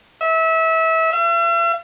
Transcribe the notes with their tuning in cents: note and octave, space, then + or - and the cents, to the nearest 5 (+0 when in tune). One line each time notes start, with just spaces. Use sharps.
E5 -25
E5 +45